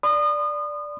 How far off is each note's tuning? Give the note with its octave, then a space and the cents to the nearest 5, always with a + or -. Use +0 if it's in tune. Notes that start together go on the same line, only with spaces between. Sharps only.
D5 +0 C6 -45 D#6 -30